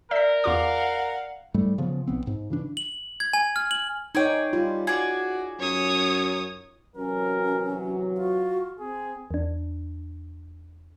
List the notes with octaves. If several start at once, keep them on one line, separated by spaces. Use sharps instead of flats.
A#4 D5 E5 B6
E2 F4 F5 F#5 D6
G#2 G3 A3
C#3 F3 B3
B1 B3 C4
G#2
C#3 E3 D4
F#7
G#6
G#5
F6
F#7
D#4 G#4 C#5 D5 G5
G3 F4
F#4 G#4 D5
F#2 C#5 D#6
C3 E3 F#3 C#4 A#4
F4 F#4
C4 G#4
E2 D4